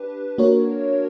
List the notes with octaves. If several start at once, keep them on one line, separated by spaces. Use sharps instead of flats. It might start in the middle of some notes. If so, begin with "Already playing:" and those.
Already playing: D4 G4 B4
A#3 D4 F#4 A#4 C#5